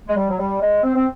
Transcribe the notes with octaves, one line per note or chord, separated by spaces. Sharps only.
G#3
G3
F#3
G3
G#3
C4
C4